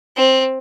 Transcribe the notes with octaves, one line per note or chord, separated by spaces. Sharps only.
C4